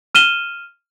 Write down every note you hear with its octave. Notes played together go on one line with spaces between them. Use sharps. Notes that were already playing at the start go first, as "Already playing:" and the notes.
F6 D#7 E7 G7